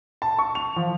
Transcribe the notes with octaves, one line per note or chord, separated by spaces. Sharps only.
A5
C#6
F7
F3